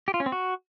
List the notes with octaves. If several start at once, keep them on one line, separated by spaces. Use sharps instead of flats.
G4
F4
C#4
C4
F#4